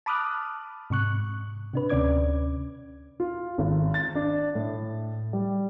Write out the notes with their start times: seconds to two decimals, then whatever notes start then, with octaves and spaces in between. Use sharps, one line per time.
0.06 A5 B5 D6 D#6 F6 F#6
0.90 G#2 C3 C#6 F#6
1.73 C3 D4 B4
1.89 D2 C3 C#4 D5 D6 G#6
3.20 F4
3.58 G#1
3.94 A6
4.15 D4
4.55 A2
5.33 G3